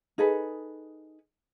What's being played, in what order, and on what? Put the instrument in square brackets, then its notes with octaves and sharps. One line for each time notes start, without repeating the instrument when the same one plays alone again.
[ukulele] D#4 G#4 A4 B4